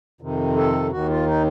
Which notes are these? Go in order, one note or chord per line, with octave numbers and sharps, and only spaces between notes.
F2 C3 D#3
A4
D#2 D#3 F#4
F4
D#4